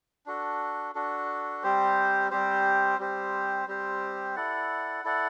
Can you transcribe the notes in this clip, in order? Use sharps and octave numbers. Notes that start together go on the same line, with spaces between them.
D4 F#4 A4
D4 F#4 A4
G3 C4 G4 C5
G3 C4 G4 C5
G3 C4 G4 C5
G3 C4 G4 C5
E4 A4 D5 F#5
E4 A4 D5 F#5